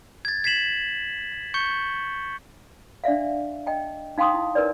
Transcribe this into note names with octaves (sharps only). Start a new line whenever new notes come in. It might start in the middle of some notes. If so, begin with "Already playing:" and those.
G#6 A6
G#6 B6 C7 E7 F#7
C#6 G6 C#7 G7
D4 D5 E5 F5
D#5 G5 A5
D#4 F5 G5 C6 D6 D#6
E4
D#4 A#4 B4 C#5 D5